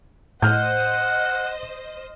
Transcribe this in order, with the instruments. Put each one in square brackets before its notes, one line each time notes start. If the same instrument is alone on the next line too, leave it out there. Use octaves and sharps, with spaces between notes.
[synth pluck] A2 [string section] C5 D#5 [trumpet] F#5 [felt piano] F6 G6